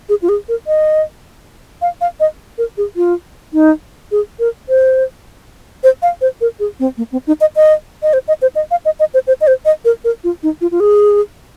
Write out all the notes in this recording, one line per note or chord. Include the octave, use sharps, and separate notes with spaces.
G#4
F4
G#4
A#4
D#5
F5
F5
D#5
A#4
G#4
F4
D#4
G#4
A#4
C5
C5
F5
C5
A#4
G#4
C4
A#3
C4
D#4
D#5
D#5
D#5
C5
D#5
C5
D#5
F5
D#5
D#5
C5
C5
D#5
C5
D#5
A#4
A#4
F4
D#4
F4
F4
G#4